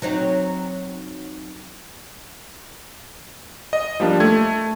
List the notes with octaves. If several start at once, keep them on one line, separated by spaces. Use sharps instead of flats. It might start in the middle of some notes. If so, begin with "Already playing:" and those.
F#3 C4 D#4
D#5
F3 G3 A#3 D4
A3 G#6